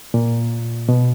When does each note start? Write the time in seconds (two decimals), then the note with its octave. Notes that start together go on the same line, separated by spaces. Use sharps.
0.14 A#2
0.89 B2